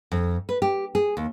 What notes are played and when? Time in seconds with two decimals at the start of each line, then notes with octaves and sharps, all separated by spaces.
0.12 F2
0.49 B4
0.62 G4
0.95 G#4
1.17 D#2